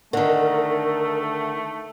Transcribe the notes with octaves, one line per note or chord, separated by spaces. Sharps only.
D3 D#3 A3 A#4